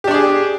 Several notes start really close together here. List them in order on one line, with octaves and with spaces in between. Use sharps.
G4 D4 D5 G#4